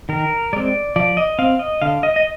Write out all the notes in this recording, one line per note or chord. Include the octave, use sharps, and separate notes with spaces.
D#3 A#4
G#3 C4 D5
F3 D5
D#5
C4 F5
D#5
D3 F5
D#5
D#5